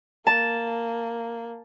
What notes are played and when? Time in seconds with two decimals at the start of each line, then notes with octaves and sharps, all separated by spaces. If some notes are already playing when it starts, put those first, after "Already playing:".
0.27 A#3 A5